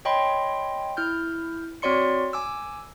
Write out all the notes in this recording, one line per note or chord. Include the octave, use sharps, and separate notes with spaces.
C#5 D#5 G5 B5 C6
E4 F6 G6
C4 F#4 C#5 D5 C6 C#7
G#5 D6 E6